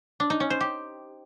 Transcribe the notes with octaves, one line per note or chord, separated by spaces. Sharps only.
D4
D#4
C#4
C5
G4